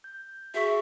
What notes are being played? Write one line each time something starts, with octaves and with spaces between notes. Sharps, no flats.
G6
F#4 G#4 E5 C#6